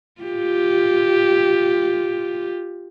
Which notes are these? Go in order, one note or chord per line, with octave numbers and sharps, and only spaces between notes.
F4 G4